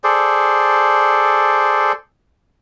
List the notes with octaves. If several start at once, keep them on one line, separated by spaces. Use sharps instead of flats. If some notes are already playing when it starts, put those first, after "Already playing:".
G#4 A4 C5 D5